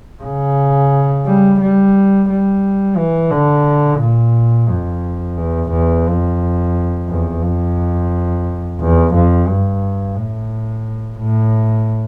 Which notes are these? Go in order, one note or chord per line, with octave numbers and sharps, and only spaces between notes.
C#3
G3
G3
G3
E3
D3
A#2
F2
E2
E2
F2
E2
F2
E2
F2
G2
A2
A2